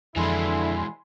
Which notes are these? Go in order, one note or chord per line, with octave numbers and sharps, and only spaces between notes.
F2 D3 E3 G#3 E4 G#5 B5 C6